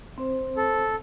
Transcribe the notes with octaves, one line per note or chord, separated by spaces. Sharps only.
C4 C5
A4